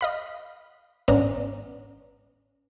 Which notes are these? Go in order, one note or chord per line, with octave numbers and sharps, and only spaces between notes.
D#5 F5 B5
G#1 B3 C#4 D4 A#5